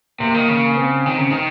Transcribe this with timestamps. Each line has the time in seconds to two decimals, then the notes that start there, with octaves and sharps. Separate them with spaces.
0.20 C3 A#3
0.35 D#3
0.49 C#3
0.77 C4
1.06 D#3
1.18 C#3
1.30 D#3